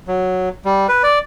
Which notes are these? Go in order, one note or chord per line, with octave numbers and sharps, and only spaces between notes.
F#3
G3
B4
D5